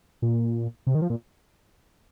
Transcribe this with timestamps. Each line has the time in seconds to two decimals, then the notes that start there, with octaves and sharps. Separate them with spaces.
0.22 A#2
0.87 C3
0.95 D#3
1.02 F3
1.10 A#2